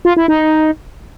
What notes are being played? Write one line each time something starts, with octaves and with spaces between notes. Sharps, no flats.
F4
E4
D#4